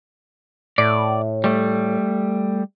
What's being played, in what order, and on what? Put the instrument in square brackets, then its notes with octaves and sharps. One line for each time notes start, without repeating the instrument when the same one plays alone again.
[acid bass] A2 [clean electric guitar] D5
[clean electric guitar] G3 A3